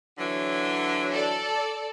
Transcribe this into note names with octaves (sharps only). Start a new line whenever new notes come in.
D3 E3 F#3
A4 D5